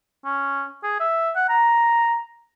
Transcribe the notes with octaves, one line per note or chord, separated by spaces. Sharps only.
C#4
G#4
E5
F#5
A#5